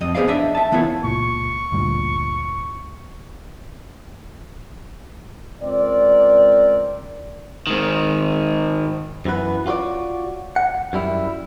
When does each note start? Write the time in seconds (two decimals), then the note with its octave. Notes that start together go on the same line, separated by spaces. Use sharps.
0.01 F2 D#5
0.15 B3 G#4 C5 D5 F5
0.28 D4 D#5 E5
0.55 E5 A5
0.72 E3 B3 E4 F4 C#5
1.04 C#2 A#2 C#6
1.72 D2 G2 A#2
5.62 C#2 C4 A#4 D5
7.67 G#2 D#3
9.25 F#2 E3 B3 B4
9.66 F4 F#4 B4 C#5 D5
10.56 F#5
10.93 F#2 G3 E4